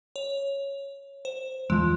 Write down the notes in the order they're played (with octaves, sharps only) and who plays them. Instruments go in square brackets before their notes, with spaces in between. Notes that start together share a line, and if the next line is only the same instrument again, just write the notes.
[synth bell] C#5
C5
[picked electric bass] E2 F3 [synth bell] G#3